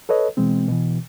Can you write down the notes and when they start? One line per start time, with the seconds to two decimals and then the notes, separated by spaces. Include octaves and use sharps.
0.09 A4 B4 C#5 D#5
0.37 B2 E3 G#3 C4
0.68 B2 E3